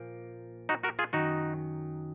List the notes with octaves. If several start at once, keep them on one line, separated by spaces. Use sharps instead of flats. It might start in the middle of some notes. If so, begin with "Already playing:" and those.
Already playing: A#2 F3 A#3
D#4 F#4
F#4 A#4
F4 G#4
F#2 D#3 F#3 D#4 F#4